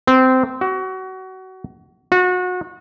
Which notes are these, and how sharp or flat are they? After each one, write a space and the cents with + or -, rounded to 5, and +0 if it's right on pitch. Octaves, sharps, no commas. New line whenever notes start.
C4 -15
F#4 +25
F#4 -30